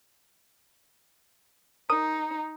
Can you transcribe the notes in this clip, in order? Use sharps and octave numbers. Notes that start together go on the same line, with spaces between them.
D#4 A#4 D#6